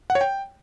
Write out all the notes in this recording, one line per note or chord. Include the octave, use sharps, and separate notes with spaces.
F#5
C#5
G5